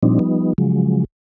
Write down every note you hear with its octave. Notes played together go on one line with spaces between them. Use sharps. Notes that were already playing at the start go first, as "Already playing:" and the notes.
A#2 F3 G3 C4 D4 D#4
F3 G3 B3 D#4
C#3 F3 F#3 G#3